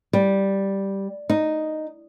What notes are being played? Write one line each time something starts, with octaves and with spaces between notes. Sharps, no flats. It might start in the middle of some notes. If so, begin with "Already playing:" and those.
G3
D#4